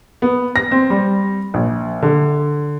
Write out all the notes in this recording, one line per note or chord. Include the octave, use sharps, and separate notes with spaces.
B3
A#6
C4
G3
A#1
D3